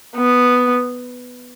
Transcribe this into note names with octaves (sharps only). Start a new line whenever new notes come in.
B3